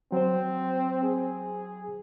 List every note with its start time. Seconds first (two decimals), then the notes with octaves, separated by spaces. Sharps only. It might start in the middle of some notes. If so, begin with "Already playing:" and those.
0.12 F#3 C4 C5
1.03 G#4